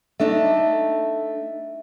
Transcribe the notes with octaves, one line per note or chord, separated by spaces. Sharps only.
A3 D4 D#4 E5